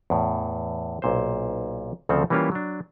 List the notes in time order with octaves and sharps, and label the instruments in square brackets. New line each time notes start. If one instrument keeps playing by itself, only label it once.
[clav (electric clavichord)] E2 A2
B1 A#2 C5
D2 C#3 F3 C4 A4 A5
E3 G3 A#3 C#4 F4 G4
F#3 D4